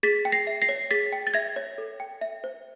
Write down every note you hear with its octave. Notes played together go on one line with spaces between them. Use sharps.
G#4 A6 B6
G5
A#6 C7
E5
A#6 C7
C#5
G#4 A6 B6
G5
A6
E5 G#6 A#6
C#5
A4
G5
E5
C5